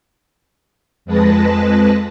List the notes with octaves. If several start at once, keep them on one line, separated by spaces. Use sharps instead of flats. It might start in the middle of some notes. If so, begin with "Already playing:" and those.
F2 G#3 B4 A5 A#6